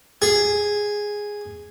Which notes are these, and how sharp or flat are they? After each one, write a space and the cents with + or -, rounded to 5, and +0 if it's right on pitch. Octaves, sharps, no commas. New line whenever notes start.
G#4 -5